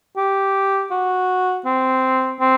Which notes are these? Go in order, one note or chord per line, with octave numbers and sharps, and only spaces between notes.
G4
F#4
C4
C4